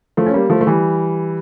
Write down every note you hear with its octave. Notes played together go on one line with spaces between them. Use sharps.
F3 A3
C#4
G3 A#3
F3 A3
A3
E3 G3